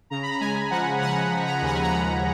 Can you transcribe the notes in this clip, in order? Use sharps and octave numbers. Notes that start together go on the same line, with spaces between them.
C#3 A#5
B5
A#5
G#3 G#5
F3 F#5
C#3 F#5
F3
A#5
D#2 F#5
G#5
A#5
D#2 B5